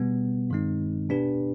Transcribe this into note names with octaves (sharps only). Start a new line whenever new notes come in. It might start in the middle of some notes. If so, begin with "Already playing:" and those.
Already playing: B2 G3 B3
G2 D#3 G#3 C4 D#4
B2 B3 D4 G4 B4